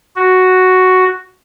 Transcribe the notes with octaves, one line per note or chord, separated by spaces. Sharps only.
F#4